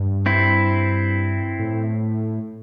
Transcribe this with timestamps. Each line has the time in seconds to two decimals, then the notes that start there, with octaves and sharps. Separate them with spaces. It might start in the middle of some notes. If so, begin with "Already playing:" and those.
Already playing: G2
0.26 C4 E4
1.59 A2